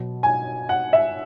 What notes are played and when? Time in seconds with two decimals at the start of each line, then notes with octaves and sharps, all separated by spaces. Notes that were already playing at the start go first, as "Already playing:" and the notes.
Already playing: B2 F#3
0.23 G#5
0.69 F#5
0.93 E5